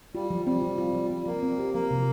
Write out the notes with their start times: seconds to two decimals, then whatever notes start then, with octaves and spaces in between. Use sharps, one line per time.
0.15 G3 F4
0.30 F3
0.46 G3 C4
0.62 F3
0.78 F4
0.94 F3
1.10 G3 C4
1.26 F3 A#3
1.43 C4
1.58 G4
1.74 F3 A#3
1.91 C3